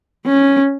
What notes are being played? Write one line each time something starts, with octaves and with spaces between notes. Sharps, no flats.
C#4